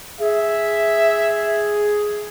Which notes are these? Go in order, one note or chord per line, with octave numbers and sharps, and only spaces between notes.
G#4 E5